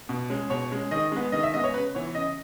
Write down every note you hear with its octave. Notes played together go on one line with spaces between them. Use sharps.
B2
G#3 C#4
B2 C#5
G#3 C#4
D#3 D#5
G#3 B3
D#3 D#5
E5
G#3 B3 D#5
C#5
C#3 B4
E3 B3 C#5
C#3 D#5